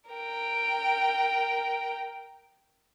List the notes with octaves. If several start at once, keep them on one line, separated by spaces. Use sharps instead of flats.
A#4 G5